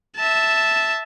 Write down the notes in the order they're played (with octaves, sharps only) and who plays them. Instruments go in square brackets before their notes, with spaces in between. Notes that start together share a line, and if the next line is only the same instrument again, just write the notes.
[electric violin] E5 A5